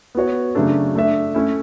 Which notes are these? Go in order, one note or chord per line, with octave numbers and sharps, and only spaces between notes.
B3 F#4 C#5
C#3 F#3 A3 D4 A4
A3 D4 A4 E5
A3 C#4 E4